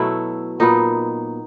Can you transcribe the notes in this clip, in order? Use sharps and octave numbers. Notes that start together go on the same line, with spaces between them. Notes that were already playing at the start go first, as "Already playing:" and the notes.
Already playing: B2 F#3 A3 E4
A#2 F#3 B3 D#4